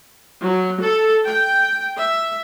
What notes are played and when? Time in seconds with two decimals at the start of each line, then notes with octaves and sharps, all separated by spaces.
0.43 F#3
0.81 A4
1.25 G5
1.97 E5